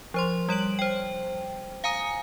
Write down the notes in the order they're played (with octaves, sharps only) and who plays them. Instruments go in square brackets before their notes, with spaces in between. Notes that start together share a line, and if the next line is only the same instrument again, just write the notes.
[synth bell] F3 C5 C6
G3 C#5 D7 F#7
C5 G5
F5 G#5 A#5 D#6 C#7